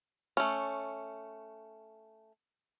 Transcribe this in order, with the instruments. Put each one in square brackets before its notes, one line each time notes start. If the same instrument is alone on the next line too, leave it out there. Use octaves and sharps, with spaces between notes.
[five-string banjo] A3 C#4